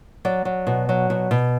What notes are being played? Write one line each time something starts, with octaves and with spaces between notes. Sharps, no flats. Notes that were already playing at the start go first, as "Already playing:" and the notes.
F#3 D5
F#3
B2
F#3
B2
B2